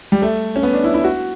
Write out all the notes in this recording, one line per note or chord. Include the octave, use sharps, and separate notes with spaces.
G3
A3
C#4
B3
D4
E4
E4
F#4